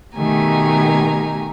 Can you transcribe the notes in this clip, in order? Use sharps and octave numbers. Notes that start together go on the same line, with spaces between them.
B2 D#3 A3 G4 G#5 A#5